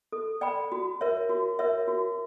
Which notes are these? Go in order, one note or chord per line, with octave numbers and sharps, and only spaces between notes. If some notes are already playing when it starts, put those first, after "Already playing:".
A4
D5 G5 B5
F#4
A#4 C#5 E5
F#4
A#4 C#5 E5
F#4